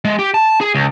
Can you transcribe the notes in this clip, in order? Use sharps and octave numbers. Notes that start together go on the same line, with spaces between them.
G#3
G4
A5
G#4
C#2